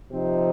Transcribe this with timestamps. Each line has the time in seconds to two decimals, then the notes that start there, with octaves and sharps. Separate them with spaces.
0.11 C3 F3 C4 D#4